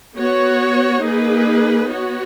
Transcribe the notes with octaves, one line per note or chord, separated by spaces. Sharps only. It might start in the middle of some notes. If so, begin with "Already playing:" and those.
B3 F#4 C#5
A#3 D#4 G#4 B4
B3 F#4 C#5